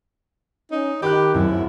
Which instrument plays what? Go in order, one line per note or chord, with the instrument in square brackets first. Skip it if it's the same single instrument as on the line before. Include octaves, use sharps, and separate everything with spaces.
[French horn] C#4 [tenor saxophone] D#4
[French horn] D#3 [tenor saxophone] G4 [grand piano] B5 D6 F#6
[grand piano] D1 [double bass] F#2 [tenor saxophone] E4